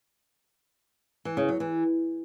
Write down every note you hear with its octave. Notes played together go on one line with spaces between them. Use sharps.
E3
C#3
F#3
E3